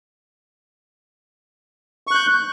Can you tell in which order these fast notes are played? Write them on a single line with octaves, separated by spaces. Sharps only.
C#6 F#6 G6